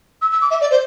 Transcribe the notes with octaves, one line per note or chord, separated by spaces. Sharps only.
E6
E6
D6
E5
D5
C5